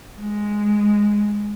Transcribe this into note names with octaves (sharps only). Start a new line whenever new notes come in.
G#3